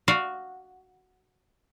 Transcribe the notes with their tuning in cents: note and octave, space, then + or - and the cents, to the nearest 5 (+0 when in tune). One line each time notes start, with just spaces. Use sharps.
F#4 +0 D5 +30 F5 +0